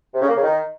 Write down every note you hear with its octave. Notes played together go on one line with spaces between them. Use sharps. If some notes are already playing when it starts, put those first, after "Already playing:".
C3
C#3
A#3
C#3
D#3